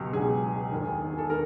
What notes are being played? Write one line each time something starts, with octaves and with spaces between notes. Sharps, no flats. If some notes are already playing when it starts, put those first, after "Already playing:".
Already playing: C#2 B2 F#3 G4
C#2 B2 F#3 G#4
E1 D#2 D#3
A4
D#3 A#4